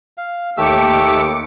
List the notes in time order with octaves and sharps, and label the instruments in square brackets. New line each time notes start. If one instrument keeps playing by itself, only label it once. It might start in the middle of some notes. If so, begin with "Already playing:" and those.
[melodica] F5
[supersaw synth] D#2 D6 C#7 [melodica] A3 G4 E6